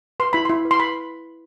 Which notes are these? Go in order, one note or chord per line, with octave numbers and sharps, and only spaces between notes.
B4 C6
E4 B5
E4 C6
B4
C6
B4 B5